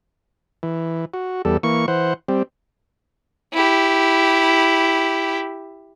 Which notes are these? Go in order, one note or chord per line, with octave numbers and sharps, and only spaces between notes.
E3
F#4
E2 G3 A4
E3 A#3 C#6
E3 C5 F#5
G3 C4
E4 G4